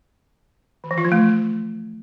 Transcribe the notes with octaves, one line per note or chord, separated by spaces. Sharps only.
D#3
E3
F4
F3
A3